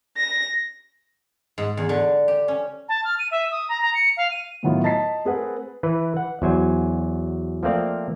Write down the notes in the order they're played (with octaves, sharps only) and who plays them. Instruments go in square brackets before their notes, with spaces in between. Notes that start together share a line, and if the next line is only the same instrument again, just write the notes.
[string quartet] A#6
[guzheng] G#2
E2
D3
G4
C#4
[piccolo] A5
F6
D#7
E5
D#6
A#5
A#5
C#7
F5
D#7
[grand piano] A2 D#3 F#3 B3 E4 F4
D#5 A5 A#5 A6 B6 C7
A3 C4 G#4 A#4 B4 F#5
[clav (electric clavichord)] E3 B4
F#5
E2 F#3 C5 G#5
F3 A3 A#3 C4 D5 F5